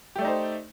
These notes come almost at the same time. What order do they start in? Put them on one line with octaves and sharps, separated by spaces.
G4 A3 D5 D#4 C5